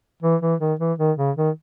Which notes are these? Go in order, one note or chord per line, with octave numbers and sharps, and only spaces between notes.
E3
E3
D#3
E3
D#3
C#3
D#3